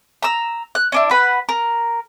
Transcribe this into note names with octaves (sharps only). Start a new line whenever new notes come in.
A#5 E6
F#6
C#4 D4 E4
B4 F#5 B5
A#4